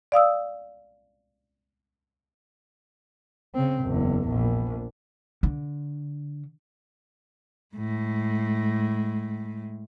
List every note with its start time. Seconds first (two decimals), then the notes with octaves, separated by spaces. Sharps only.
0.12 D5 F5 D#6 E6
3.55 C#3 C4
3.85 F#1 E2
4.29 A#1
5.43 D3
7.75 A2 G#3